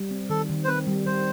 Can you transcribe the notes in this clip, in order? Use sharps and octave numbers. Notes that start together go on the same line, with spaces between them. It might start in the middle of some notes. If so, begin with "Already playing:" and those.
Already playing: G3
C4
D#3 A4
D#3
C5
C4 B4
G3
G3 C5